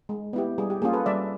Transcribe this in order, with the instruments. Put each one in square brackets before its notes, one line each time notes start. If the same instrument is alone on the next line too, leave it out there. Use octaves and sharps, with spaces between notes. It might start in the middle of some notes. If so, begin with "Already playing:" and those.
[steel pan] G#3
B3 E4 G4
G3 G#4
G4
A#3 C#4 F4 G#4
A4 B4
G3 D5 E5